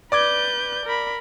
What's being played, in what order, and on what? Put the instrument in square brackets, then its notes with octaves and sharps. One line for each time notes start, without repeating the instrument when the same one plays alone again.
[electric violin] B4 G6 [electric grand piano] D5 D6 G#6
[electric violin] A#4 B5